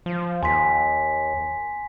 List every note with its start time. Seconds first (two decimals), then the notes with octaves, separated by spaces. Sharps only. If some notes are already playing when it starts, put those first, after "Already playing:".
0.06 F3
0.43 D#2 G#5 C6 B6